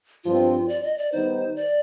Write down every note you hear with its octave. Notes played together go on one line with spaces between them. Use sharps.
G2 F3 C4 F4
D5
D#5
D5
D#3 G3 B3 D#4 C5
D5